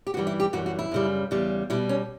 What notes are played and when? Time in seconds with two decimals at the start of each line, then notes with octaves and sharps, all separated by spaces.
0.07 G4
0.14 G2 E3 G3 F#4
0.27 E4
0.40 G4
0.53 F#2 E3 G3 F#4
0.66 F#4
0.79 E4
0.91 F#2 C#3 G3
1.31 E2 C#3 G3
1.70 B2 G3 E4
1.89 C#4